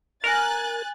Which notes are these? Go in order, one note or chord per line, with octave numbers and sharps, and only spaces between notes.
A#4 G#5 F#6 A6